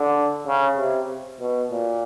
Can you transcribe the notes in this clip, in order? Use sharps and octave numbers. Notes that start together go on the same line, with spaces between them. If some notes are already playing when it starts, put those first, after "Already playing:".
Already playing: D3
C#3
C3
B2
A#2